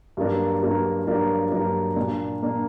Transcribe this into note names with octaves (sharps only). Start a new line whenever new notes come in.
G2 F#3 A#3 D4 A#4
G2 F#3 A#3 D4 A#4
G2 F#3 A#3 D4 A#4
G2 F#3 A#3 D4 A#4
A#2 A#3 D4
A#2 A#3 D4